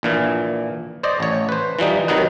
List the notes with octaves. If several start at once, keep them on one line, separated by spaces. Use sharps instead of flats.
A#1 A#2 E3
C5 D5 D#5
A1 C#5
B4 C5
E3 F3 G3 D#4
C3 D#3 F#3 D#4 B4